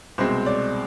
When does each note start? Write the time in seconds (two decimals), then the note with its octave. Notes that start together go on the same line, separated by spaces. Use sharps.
0.18 C2 B2 G#3 C4 C5
0.46 D5